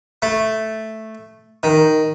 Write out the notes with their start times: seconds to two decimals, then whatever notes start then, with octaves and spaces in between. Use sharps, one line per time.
0.22 A3
1.63 D#3